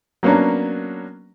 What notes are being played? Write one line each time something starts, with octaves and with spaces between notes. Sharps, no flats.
F#3 A#3 B3 C#4 D4